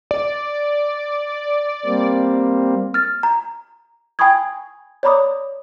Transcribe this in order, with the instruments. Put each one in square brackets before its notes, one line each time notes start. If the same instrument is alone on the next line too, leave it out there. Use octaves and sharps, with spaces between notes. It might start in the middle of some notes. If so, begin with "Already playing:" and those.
[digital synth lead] D5
[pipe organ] G3 A#3 C4
[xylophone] F6 A6
A#5
G5 G#5 B5 C#6 D#6 G#6
C#5 D5 A#5 B5 D6 D#6